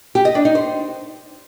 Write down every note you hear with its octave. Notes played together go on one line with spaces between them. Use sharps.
G4
D#5
D4
D#4
C5